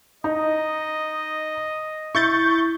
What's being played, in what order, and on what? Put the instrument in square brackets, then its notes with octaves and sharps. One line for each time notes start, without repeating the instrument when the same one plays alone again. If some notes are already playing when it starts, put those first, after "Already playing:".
[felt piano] D#4 [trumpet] D#5
[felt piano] E4 [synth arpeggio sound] C#6 G6 A6